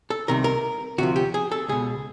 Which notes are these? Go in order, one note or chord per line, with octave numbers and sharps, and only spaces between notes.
A4
C2 C3 D#3 A#4
A#4
D2 C3 F3 F#4
G4
G#4
A4
C#2 B2 G#4